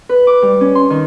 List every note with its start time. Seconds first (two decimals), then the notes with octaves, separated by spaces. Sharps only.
0.09 B4
0.27 D6
0.42 G3
0.61 C#4
0.75 C6
0.90 D#3